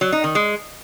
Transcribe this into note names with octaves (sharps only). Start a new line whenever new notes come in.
F#3
D#4
D#3
G#3